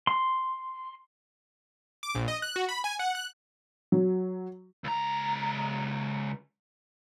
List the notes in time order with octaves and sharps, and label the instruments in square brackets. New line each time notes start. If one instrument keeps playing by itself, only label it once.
[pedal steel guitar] C6
[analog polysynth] D6
A#1
D#5
F#6
F#4
B5
G#5
F#5
F#6
[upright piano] F#3
[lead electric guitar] C#2 A#5